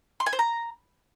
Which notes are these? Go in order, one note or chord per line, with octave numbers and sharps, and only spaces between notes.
C6
G#5
C5
A#5